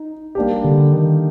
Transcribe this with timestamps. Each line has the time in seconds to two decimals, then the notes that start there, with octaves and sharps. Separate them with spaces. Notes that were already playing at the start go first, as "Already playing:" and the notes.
Already playing: D#4
0.35 G3 A#3 D4 G4
0.64 D3
0.92 D#3